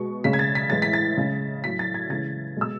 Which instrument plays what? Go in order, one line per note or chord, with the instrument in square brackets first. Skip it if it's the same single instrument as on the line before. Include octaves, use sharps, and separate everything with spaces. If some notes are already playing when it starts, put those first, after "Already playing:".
Already playing: [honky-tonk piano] B2 G#3 C#6
C#3 G#3 B6
G#6
A6
B6
A2 E3 G#3 A6
B6
A6
C#3 G#3
A2 F#3 B6
A6
G#6
C#3 E3 G#3 A6
B2 G#3 E6